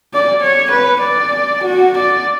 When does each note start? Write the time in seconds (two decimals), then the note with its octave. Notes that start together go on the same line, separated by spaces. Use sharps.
0.14 D5
0.42 C#5
0.72 B4
1.01 D5
1.64 F#4
1.98 D5